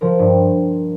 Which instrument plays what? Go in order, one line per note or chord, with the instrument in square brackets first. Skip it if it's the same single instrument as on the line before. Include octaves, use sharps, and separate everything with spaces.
[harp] F3 A#4
G2